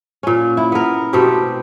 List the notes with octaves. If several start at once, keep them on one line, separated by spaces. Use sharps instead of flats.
A#2 C#4
E4
B3 A#4
B2 A3 C4 G4